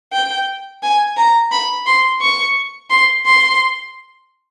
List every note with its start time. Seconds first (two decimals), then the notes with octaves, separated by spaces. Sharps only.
0.13 G5
0.83 G#5
1.17 A#5
1.52 B5
1.87 C6
2.21 C#6
2.91 C6
3.26 C6